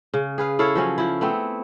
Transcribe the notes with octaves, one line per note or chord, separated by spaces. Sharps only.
C#3
G#4 B4 F5
E4 A4 C#5 F5
F3 F#3 C#4
F3 E4
A3 B3 C4